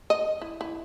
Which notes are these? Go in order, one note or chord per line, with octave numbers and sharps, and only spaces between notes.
D#5
E4
E4